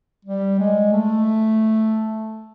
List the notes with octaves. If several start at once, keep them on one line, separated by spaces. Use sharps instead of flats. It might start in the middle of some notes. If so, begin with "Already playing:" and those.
G3
G#3
A3